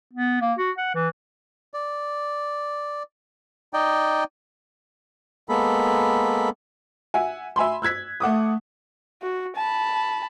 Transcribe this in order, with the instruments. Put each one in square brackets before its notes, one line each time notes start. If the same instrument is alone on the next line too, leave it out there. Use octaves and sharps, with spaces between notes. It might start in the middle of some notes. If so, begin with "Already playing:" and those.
[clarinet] B3
A#3
F#4
F#5
E3
[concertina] D5
D#4 D5 D#5 G5
G#3 A#3 B3 A4 B5
[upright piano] E5 F#5 G#5
E5 G#5 B5 C6
E6 F#6 G#6 B6
A3 F#5 D6 D#6
[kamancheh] F#4
A5 B5